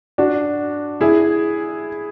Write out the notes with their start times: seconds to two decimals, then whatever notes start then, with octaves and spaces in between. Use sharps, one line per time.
0.18 D4 F#4
1.01 E4 G#4